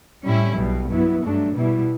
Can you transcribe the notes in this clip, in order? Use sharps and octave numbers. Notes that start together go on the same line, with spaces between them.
A2 G3 C#4 E4
B1 B2 G3
G2 F#3 B3 E4
G2 F#3 A3 D4
B2 G3 B3 E4